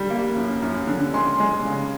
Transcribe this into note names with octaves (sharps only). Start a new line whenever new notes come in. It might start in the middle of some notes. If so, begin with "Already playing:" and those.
Already playing: D3 G3
A#3
F#2
F#2
D3
G#3 C6
G#3
C#3